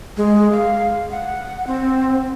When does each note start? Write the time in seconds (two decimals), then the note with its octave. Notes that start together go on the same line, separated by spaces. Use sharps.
0.17 G#3
0.52 F5
1.11 F#5
1.67 C4